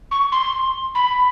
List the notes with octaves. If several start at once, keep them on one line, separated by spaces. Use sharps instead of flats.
C#6
C6
B5